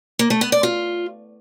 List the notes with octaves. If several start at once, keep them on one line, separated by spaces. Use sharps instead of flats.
A#3
A3
B3
D5
F4